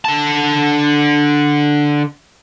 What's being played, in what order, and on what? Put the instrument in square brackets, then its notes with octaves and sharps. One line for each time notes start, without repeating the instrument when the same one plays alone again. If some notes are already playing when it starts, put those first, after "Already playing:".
[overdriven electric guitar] D3 A5